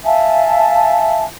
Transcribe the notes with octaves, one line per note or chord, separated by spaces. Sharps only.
E5 F5 G#5 A5